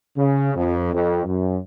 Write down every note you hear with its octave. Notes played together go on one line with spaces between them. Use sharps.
C#3
F2
F2
F#2